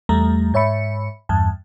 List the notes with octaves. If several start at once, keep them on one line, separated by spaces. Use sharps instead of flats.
E2 G3 A3 A#5
G#2 C#5 E5 B5 C#7
E2 G2 A5